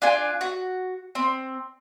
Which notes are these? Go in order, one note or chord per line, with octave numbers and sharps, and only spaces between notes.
D4 F4 G#5
F#4
C4